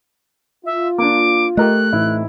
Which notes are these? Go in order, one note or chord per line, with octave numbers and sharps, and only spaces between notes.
F4 E5
A#3 D4 D6
A3 G4 A#4 D#5 F#6
A1 E3 C4 D#4 E4